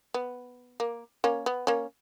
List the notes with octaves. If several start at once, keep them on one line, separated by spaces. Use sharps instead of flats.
B3
A#3
A#3 C#4
B3
A#3 C#4